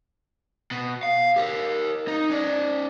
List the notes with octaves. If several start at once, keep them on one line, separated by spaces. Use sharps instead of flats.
B2
F5
G4 A#4
D#4
C#4 D5